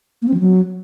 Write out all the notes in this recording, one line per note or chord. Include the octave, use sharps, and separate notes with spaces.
A#3
C4
F3
F#3